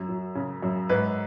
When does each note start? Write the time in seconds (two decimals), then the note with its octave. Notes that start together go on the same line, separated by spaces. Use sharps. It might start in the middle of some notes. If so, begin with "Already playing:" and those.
Already playing: F#2
0.08 F#3
0.35 C#3
0.62 F#2
0.89 G#2 B4